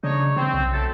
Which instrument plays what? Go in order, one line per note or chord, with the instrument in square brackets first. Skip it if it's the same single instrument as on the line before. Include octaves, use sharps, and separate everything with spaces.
[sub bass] C#3 [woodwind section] D4 D#4 C#5
[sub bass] C#3 [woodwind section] C4
[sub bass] B1
[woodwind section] F#3 A3 A4